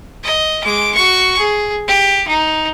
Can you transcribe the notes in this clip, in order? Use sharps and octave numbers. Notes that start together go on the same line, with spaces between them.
D#5
G#3 D6
F#4 C#6
G#4
G4
D#4